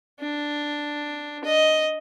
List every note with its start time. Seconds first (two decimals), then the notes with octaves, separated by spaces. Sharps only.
0.20 D4
1.44 D#5